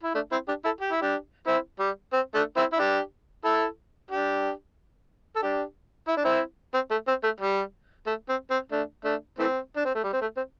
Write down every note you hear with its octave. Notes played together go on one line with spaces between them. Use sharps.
E4
A3 D4
C4 E4
D4 G4
E4 A4
G4
E4
D4 G4
C4 E4
G3
C4
A3 D4
C4 E4
E4
D4 G4
E4 A4
D4 G4
A4
D4 G4
E4
D4
C4 E4
C4
A3
C4
A3
G3
A3
C4
C4
A3 D4
A3 D4
E3 A3 C4
D4
C4
A3
G3
C4
A3
C4